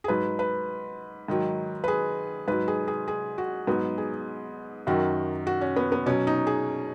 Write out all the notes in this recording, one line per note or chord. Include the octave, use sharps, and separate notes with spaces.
G#4
G#2 F#3 B4
B4
G#2 D#3 F#3
B4
G#4
G#2 F#3 B4
G#4
G#4
G#4
F#4
G#2 F#3 B3
G#4
F#2 D#3 F#3 F#4
F#4
C#4
B3
B3
B2 F#3 C#4
D#4
G#4